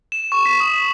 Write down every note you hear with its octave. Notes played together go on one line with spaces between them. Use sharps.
E7
C#6
B6
D#6